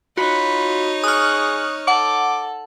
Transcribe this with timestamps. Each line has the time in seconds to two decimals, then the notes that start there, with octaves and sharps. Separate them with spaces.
0.17 D#4 F4 F#4 C#5 B5
1.04 G#4 C#6 D#6 F6 F#6
1.88 A4 F#5 D6